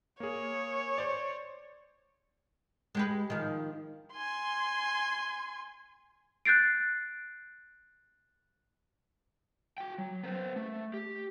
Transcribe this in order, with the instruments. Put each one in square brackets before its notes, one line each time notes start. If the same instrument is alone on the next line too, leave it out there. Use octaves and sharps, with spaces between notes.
[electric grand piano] A#3 G#4 [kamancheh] C#5
[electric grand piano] C5 D5
[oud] G#3 G4 B4
D#3 F3
[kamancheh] G#5 C6
[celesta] F#6 G6 A6 C7 D7
[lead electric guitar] F#4 G5
F#3
B3 C5
A3
G4